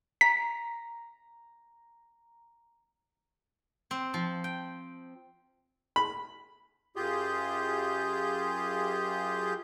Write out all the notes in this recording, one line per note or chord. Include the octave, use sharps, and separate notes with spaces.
A#5 B6
C4
F3
G5
B5
F#2 F4 G4 G#4 G6